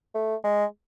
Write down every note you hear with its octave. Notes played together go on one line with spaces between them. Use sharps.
A3
G#3